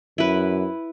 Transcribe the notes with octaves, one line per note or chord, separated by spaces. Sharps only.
F#2 E4 B4